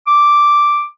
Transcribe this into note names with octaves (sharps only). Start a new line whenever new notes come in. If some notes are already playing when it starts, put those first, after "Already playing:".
D6